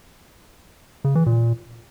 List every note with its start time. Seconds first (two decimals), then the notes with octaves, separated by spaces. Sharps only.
1.04 C#3
1.15 E3
1.26 A#2